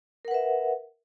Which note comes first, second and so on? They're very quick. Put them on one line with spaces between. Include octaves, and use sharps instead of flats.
A#4 F#5 B4 E5